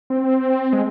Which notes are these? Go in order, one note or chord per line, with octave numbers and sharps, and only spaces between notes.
C4
G#3